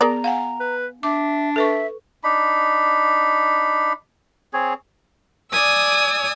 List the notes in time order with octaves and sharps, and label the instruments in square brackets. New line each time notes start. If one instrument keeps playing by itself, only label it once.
[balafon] B3 [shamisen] G#4 A#4 D5 [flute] A#5
[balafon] F5 F#5 G#5
[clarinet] B4
[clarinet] D4 [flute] E5 [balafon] D6
[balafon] A4 B4 C#6 [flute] E5
[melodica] D4 D#4 B5
C4 G#4 C#5
[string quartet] D5 G#5 D#6 E6